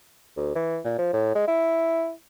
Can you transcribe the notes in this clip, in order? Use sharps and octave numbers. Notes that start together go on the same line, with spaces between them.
D2
E3
A#2
F3
A2
G#3
E4